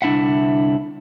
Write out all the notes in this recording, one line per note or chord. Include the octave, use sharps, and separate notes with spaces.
C2 D3 D4 E4 E5 F#5